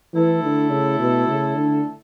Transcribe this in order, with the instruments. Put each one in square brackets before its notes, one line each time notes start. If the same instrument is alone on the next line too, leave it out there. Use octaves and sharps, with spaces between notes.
[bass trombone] E3 [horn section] A3 E4 A4
[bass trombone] D3
C#3
B2
C#3
D3